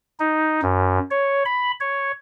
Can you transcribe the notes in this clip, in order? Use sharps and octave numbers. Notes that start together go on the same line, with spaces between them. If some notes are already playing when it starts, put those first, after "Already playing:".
D#4
F#2
C#5
B5
C#5